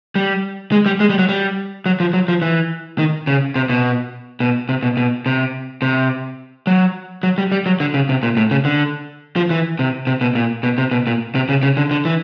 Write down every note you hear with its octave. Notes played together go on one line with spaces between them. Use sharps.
G3
G#3
G3
G#3
G3
F#3
G3
F#3
F3
F#3
F3
E3
D#3
C#3
C3
B2
B2
C3
B2
B2
C3
C3
F#3
F#3
G3
G3
F#3
D3
C#3
C3
A#2
A2
C#3
D3
F3
E3
C3
C3
B2
A#2
B2
C3
B2
A#2
C3
C#3
C#3
D3
D3
E3